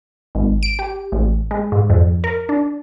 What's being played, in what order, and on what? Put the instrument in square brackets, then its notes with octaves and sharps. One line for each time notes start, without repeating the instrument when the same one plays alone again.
[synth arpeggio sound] G#1
D7
G4
A1
G#3
G#2
F2
A#4
D4